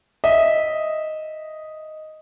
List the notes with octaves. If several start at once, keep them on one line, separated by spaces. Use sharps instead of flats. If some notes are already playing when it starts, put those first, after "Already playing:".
D#5 E5